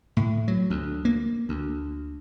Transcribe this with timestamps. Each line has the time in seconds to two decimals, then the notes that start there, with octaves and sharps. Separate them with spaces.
0.17 A2
0.48 F#3
0.70 D2
1.05 A#3
1.49 D2